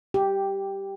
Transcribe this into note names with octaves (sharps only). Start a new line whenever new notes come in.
G4